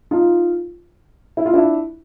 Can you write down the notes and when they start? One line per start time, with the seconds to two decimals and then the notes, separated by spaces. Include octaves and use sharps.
0.11 D#4 F4
1.37 E4
1.45 F4
1.54 D4 E4